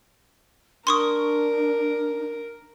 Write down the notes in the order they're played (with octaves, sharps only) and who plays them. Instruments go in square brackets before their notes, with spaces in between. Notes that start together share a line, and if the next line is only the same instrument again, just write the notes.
[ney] D4 [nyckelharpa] A#4 [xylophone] C6 C#6 D#6